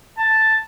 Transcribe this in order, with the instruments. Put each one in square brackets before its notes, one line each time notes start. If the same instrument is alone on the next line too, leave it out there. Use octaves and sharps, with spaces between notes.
[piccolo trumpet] A5